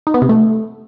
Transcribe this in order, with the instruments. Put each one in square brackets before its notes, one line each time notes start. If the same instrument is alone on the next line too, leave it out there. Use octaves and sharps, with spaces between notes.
[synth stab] D#4
B3
C3
A3